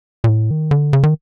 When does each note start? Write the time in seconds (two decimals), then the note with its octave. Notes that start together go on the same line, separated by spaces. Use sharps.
0.24 A#2
0.29 A2
0.51 D#3
0.71 D3
0.93 C#3
1.03 D#3